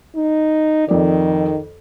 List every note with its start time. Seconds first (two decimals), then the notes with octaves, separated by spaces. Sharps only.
0.16 D#4
0.88 F2 D#3 D5